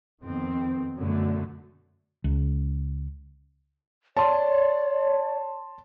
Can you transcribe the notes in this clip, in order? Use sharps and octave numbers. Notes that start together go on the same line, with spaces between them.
F2 D#3 B3 C4
F#2 B2 D3 F#3 A3
C#2
C#5 D5 A5 C6